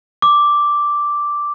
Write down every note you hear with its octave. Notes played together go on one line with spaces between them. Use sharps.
D6